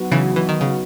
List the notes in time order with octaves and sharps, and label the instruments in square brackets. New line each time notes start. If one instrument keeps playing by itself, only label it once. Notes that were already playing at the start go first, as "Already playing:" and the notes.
Already playing: [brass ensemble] F#3 B3 D#4 F#4
[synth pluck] C#3 E3
E3
D#3
C#3